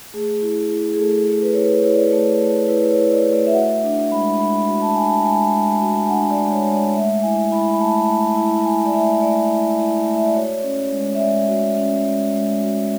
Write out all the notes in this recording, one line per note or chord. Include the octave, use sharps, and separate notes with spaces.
A3 G#4
E4
E4
G#4
A3 A4
A3
B4
E4 C#5
B4
E4 C#5
D5
C#5
A3
A3
E4 B4
C#5
E4
D5
A3
D5
E5
F#4 F#5
D4
G#3 B5
G#3 B5
F#4
A5
D4 G#5
A5
G#3 G#5
G#3
F#4
G#5
D4 F#5
D5
G#3
C#5
G#3
D5
A3 E5
E4 G#5
E4 B5
B5
A3 A5
A3
E4
E4 G#5
D5
A3 E5
A3 D5
E4
E4
A3
E5
D5
F#4 C#5
C#4
G#3
E5
G#3 D5
F#4
C#4
G#3
G#3
F#4